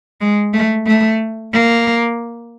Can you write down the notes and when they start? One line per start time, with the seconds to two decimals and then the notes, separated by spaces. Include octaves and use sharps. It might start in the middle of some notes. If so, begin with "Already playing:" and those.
0.21 G#3
0.54 A3
0.86 A3
1.53 A#3